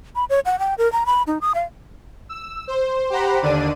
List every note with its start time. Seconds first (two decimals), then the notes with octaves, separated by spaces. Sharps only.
0.16 B5
0.30 C#5
0.45 F#5
0.59 G5
0.78 A#4
0.92 A#5
1.06 B5
1.27 D#4
1.41 D#6
1.55 F5
2.29 E6
2.68 C5
3.10 G4 C5 F#5 A#5 B5
3.42 D#2 D3 D4 D5 D#7